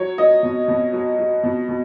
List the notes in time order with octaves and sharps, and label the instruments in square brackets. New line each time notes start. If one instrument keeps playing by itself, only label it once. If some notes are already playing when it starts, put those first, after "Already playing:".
Already playing: [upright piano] F#3 C#5
F#3 D#5
B2
B2
F#3
F#3
B2
B2